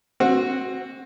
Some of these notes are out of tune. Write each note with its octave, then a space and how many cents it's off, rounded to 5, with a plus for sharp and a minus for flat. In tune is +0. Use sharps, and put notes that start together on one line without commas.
C4 +25 F#4 +0